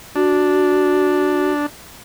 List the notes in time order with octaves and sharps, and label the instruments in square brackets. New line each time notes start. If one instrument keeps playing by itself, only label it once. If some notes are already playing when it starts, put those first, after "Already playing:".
[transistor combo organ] D4 [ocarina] F#4